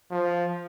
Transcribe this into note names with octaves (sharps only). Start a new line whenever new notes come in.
F3